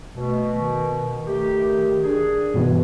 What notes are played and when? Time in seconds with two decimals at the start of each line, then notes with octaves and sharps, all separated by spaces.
0.16 B2 A3
0.58 D#3
1.27 A3 G4
2.02 D4 G#4
2.54 G2 B2 E3